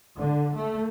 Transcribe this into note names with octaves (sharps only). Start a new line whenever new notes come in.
D3
A3